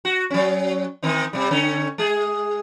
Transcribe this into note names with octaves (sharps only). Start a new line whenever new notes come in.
F#4
F#3 C#4
D#3 C4 D#4
C3 G3
D3 C#4
G#3 G#4